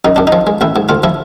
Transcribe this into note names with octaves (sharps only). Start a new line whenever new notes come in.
F#2 D#4
F#2 D4
D#4
F3
G#3
A1 E4
G#2
D2 F4
F3 E4